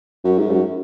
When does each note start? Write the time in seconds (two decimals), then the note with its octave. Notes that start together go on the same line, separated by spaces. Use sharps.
0.25 F#2
0.38 G#2
0.51 F#2